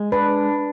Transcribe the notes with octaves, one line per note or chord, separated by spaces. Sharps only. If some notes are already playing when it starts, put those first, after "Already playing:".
Already playing: G#3
D4 B4